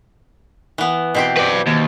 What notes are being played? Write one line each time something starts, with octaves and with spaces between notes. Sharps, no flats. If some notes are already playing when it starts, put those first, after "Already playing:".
E3 B3
B2 C4 G4
B4 D5
D#2